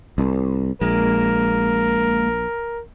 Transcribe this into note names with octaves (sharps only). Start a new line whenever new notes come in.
C2
A#1 G#3 A#3 A#4